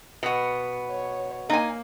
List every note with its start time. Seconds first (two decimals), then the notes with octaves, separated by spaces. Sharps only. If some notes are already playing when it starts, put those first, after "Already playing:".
0.23 B2 B3
0.91 C#5
1.50 A#3 D#4 G#5